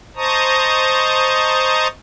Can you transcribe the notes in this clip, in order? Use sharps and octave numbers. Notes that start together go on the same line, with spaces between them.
C5 D#5 A5 A#5 C#6 D#6